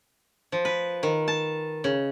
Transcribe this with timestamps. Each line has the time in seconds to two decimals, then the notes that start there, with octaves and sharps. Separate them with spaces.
0.52 F3
0.65 B4
1.03 D#3
1.28 A5
1.84 C#3